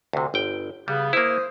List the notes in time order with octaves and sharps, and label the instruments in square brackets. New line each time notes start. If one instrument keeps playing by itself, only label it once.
[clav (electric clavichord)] D2 C3
G1 G5
[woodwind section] C#3 B3 [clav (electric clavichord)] G3
[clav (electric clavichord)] A#3 E4 [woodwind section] C5 D#6